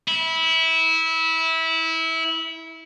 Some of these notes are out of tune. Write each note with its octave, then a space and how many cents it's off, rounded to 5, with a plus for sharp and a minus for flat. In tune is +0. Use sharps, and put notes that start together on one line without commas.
E4 -20